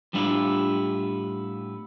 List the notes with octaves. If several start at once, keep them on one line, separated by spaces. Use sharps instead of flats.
A2 G3 B3 D4 E4 F4